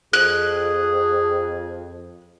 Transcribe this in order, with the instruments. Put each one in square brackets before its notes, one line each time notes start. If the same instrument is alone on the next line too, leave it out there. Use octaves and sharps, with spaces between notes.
[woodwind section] F2 [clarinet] G#4 [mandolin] F#6